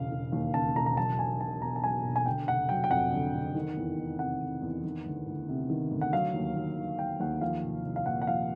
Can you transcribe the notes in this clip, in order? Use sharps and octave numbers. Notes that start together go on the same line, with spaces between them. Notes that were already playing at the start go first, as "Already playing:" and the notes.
Already playing: E1 C#3 F5
E1
D#2
C#3 A5
E1 A#5
A#5
F#3 A5
B1 G#5
B1 A5
B2 A#5
A5
F#3 G#5
B1
G#5
D3 G5
F1 F#5
F#3 G5
G5
F2 F#5
D3
F1
D#3
E2
E2
C3 F#5
D#3
E2
D#3
D2
D2
C3
D#3
D2
F#5
F#3 F5
D#2
D#2
D#3
F#3 G5
D#2 F#5
F3 F5
C2
C2
F5
A#2 F#5
F#5
F3 F5